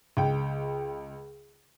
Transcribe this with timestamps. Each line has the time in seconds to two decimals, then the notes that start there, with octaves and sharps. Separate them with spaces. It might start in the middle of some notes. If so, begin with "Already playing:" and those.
0.17 C#2 G5